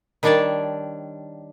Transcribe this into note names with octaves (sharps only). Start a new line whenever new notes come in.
D#3 G3 D4 C#5 D5 A5